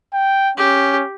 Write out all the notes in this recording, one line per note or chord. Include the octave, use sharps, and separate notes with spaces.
G5
C#4 G4